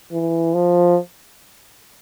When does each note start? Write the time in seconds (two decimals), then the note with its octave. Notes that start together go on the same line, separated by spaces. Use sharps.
0.12 E3
0.54 F3